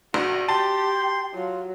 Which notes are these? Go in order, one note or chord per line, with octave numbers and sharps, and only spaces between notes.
A#1 F#4
G4 G5 A5 C6
F#3 F4